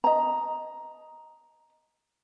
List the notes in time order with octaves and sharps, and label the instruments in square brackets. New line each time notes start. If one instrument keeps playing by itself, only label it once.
[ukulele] D#5 A#5